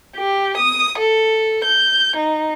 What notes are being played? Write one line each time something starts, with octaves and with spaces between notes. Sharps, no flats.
G4
D#6
A4
G6
D#4